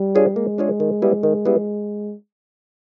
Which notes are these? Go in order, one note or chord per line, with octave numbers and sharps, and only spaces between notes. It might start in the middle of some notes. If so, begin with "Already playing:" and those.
Already playing: G3
D4 F4 G#4 C#5
G#3 A#3
D4 F4 G#4 C#5
D#3
G3 B3 E4 G#4
D#3
G3 B3 E4 G#4